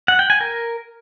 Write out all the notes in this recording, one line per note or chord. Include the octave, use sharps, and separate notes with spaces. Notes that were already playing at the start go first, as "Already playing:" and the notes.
F#5
G5
G#5
A#4